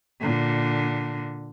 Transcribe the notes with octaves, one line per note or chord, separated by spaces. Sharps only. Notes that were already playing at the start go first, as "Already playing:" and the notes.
A#2 D3